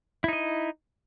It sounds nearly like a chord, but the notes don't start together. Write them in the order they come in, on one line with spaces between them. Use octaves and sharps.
E4 D#4 D#5